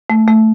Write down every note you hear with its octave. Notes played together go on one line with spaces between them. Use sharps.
A3
A3